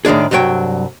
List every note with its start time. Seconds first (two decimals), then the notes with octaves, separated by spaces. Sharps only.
0.05 A2 D#3 G#3 D4 G#4
0.31 C2 G2 F#3 C#5 G5